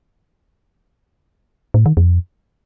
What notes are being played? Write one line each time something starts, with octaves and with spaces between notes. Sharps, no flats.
A2
D#3
F2